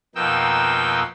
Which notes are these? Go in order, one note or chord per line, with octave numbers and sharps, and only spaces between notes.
F2 B2 A#3 D#4 G5 E6